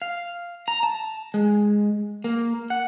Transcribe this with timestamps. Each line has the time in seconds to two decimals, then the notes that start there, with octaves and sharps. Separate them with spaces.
0.02 F5
0.68 A#5
0.83 A5
1.34 G#3
2.24 A#3
2.70 F#5